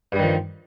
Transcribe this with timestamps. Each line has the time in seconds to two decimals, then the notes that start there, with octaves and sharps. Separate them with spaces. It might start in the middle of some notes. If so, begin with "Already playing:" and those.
0.12 G2
0.16 G3
0.19 D#3
0.23 F3